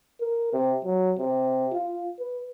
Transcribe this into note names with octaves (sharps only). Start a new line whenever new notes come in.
A#4
C3
F#3
C3
F4
B4